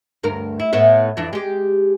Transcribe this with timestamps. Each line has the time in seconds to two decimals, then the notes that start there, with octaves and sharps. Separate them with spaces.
0.23 D2 G2 A#4
0.60 E4
0.73 A2 B3 E5
1.17 F2 E3 D4
1.33 G#3 G4